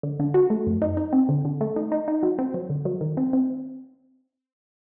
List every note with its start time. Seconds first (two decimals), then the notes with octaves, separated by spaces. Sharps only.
0.03 D3
0.20 D3
0.34 F#4
0.50 A3
0.67 F#2
0.82 D#4
0.97 D#4
1.13 C4
1.29 D3
1.45 D3
1.61 A3
1.76 D#4
1.92 D#4
2.08 D#4
2.23 F#3
2.39 C4
2.54 F#3
2.70 D3
2.85 F#3
3.01 D#3
3.17 C4
3.33 C4